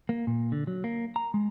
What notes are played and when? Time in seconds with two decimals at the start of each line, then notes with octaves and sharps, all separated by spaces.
0.09 A#3
0.27 A#2
0.52 D3
0.67 F#3
0.84 A#3
1.16 A#5
1.34 G#3